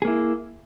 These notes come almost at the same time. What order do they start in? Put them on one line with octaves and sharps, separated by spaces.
G#4 A#3 E4